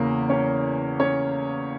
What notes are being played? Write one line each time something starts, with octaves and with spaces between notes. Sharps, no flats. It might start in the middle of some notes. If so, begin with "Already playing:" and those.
Already playing: E2 C#3 E3 A#3 A#4
C#4 C#5
C#4 C#5